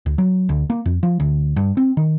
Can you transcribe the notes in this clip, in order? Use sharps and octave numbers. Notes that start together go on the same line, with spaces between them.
D2
F#3
D2
A#3
F2
F3
D2
G2
C4
D#3